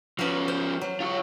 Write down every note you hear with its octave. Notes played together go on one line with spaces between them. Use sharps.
F3 C#4 F#4 A#4 B4
C5
F#3
F4 C#5